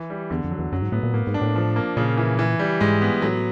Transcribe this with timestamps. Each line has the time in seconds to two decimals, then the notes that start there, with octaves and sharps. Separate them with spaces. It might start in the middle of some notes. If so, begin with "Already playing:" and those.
Already playing: E3
0.10 G3
0.30 E2 D3
0.44 F2
0.51 F#3
0.59 E2
0.72 F#2 F#3
0.82 G#2
0.92 A2 B3
1.03 A#2
1.13 A2 A#3
1.27 G#2
1.34 D4
1.41 A2
1.55 F3
1.76 A#3
1.97 A#2 C#3
2.17 E3
2.39 E3
2.59 G3
2.80 G#2 G#3
3.01 B3
3.22 A2 F#3